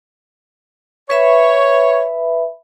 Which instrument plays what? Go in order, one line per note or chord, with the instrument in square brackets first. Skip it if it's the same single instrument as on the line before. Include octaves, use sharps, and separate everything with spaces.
[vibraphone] B4 E5 B5 [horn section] C#5